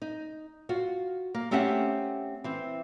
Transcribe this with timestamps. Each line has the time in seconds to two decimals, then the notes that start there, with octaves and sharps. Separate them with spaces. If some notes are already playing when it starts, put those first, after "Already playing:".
0.02 D#4
0.69 F4 F#4
1.34 A#3
1.51 A3 C4 C#4 G4 E5 F#5
2.44 E3 C4